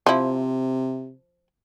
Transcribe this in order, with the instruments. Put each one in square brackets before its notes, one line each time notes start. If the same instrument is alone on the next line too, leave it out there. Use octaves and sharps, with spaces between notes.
[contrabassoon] C3 [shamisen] F3 E4